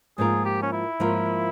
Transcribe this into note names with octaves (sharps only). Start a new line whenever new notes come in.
G#2 F3 A#3 F4 G#4 A#4
G4
C#4
E4
G#2 F3 A#3 F4 A#4